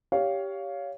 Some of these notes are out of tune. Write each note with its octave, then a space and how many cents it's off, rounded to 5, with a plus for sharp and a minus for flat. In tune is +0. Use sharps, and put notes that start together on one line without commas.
G4 +0 C#5 +20 F5 +0